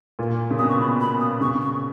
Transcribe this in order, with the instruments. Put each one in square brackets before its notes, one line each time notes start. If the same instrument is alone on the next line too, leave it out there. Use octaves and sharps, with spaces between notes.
[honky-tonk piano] A#2
C#3
[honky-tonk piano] B2 [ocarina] D#6
[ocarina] C#6
B5
B5
D#6
[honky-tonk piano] C#3 [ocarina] C#6
[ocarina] C#6